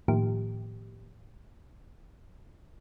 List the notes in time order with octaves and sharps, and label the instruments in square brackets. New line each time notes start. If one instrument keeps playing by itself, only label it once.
[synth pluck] A2 D#3 F3 A#3 G4